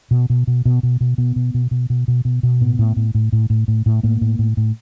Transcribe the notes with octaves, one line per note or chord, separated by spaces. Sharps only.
B2
B2
B2
B2
B2
B2
B2 B3
B2
B2
B2
B2
B2
B2
B2
A2 B3
A2
A2
A2
A2
A2
A2
A2
A2 A#3
A2
A2
A2